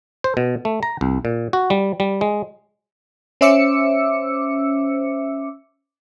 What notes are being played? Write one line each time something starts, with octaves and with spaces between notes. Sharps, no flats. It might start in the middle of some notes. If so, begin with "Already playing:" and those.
C5
B2
A3
A#5
C2
A#2
F#4
G3
G3
G#3
C#4 C5 E5 D6 E6 C#7